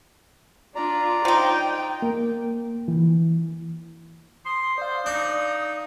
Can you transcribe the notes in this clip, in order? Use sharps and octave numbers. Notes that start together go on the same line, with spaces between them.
D4 F4 D5 A#5
F3 D#4 G5
A#3
E3
C6 D#6
C5 D5 F5
D4 D#4